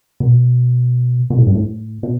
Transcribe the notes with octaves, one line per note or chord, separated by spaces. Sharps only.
B2
B2
A2
G2
A2
B2